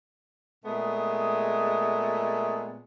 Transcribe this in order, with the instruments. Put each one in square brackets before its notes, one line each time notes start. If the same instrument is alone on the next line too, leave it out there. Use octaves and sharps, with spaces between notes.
[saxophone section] A#2 G#3 A3 B3